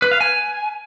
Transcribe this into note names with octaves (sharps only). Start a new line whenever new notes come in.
B4
F5
G#5